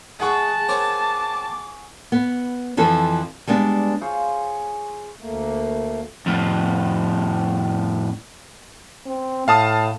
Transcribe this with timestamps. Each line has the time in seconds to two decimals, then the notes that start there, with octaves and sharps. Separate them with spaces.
0.20 G#3 G#4 F#5 A5 C#6
0.68 C4 A#4 C#5 D6
2.12 B3
2.77 F2 E3 F3 A4
3.47 G3 G#3 B3 D4
4.01 F4 G#4 C5 C#5
5.19 D2 A3 A#3
6.26 F2 A2
9.06 C4
9.48 A2 F5 A5 D#6